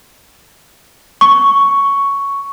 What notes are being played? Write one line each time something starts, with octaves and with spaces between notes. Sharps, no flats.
C#6